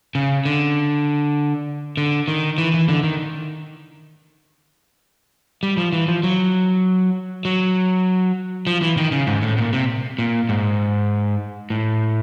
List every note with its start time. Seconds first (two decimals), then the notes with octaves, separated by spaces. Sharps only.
0.15 C#3
0.46 D3
1.97 D3
2.28 D#3
2.58 E3
2.74 E3
2.89 D3
3.04 D#3
5.63 G3
5.77 F3
5.93 E3
6.08 F3
6.23 F#3
7.45 F#3
8.67 F3
8.82 E3
8.97 D#3
9.12 C#3
9.27 G#2
9.42 A2
9.58 A#2
9.73 C3
10.19 A#2
10.49 G#2
11.70 A2